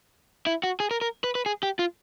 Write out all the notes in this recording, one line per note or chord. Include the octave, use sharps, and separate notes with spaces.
E4
F#4
G#4
A#4
A#4
B4
B4
G#4
G4
F4